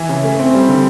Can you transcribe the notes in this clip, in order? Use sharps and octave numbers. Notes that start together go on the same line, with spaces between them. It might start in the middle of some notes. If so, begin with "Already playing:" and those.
Already playing: E3 E4
C#3
A3
C4
G3
D3